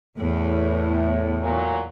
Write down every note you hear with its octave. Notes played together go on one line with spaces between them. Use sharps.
E2 A2
A#2 F#3